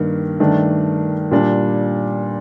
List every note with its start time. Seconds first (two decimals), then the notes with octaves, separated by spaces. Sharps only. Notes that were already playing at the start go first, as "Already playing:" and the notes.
Already playing: G2 D#3 A#3
0.40 G2 D#3 A3 D4
1.31 A#2 G3 D4